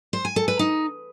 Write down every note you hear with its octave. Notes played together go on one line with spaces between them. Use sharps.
C5
G#5
A4
B4
D#4